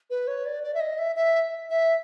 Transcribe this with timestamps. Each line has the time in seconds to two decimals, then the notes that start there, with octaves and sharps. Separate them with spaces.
0.10 B4
0.28 C#5
0.46 D5
0.64 D5
0.74 E5
0.80 D#5
0.99 E5
1.16 E5
1.70 E5